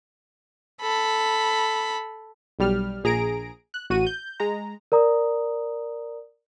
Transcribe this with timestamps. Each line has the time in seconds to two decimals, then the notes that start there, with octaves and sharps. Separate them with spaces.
0.81 A4 B5
2.59 B1 G3 F6
3.04 A#1 G#4 A#5 A#6 D7
3.74 F#6
3.90 A1 F#4 D#7
4.06 G6
4.40 G#3 A#5
4.92 A#4 D5 A#5 D#6